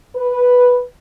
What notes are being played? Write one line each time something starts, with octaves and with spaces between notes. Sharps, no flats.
B4